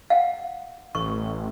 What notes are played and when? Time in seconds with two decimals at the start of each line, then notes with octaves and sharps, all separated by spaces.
0.10 F5 F#5
0.95 A1 C#6